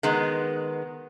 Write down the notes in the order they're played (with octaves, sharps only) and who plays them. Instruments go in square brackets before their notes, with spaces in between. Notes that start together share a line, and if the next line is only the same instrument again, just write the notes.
[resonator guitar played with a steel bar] D#3 G#3 B3